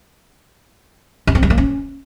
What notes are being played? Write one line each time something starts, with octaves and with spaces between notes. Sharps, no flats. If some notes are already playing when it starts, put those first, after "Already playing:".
C#4
C4
G#3
A#3
C#4